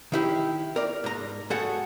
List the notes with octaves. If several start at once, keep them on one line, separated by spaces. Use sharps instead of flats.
D#3 E4 G4
A#4 D5
G#2 A#5
A3 F#4 G#4 A4 F#5